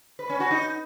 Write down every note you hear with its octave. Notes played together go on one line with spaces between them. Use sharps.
B4
C#4
F#4
D#4